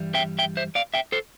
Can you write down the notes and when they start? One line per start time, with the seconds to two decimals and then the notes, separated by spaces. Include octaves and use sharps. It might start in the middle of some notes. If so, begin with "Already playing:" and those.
Already playing: G2 E3 G3
0.14 E5 G5
0.39 E5 G5
0.57 C5 E5
0.75 D5 F5
0.94 E5 G5
1.12 A4 C5